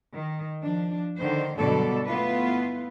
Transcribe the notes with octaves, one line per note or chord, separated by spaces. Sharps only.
D#3
F3 D4
D3 D#3 C5
G2 B2 D3 F#3 A4 D5
A3 B3 E4 F4 B4